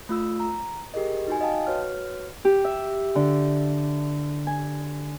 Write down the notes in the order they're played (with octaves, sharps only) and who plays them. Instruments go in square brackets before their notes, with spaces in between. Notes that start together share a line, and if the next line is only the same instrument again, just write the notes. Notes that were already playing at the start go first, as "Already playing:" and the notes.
[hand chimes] A3 F4 E6
A#5
G4 G#4 A#4 D#5
D#4 F#4 G#5
D#5 F5 G5 A5
F#4 B4 C#5 F6
[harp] G4
E5
D3
G#5